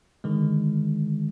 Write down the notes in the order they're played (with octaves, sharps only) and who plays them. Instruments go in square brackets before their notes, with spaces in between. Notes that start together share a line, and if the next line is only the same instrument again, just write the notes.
[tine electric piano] D3 D#3 G#3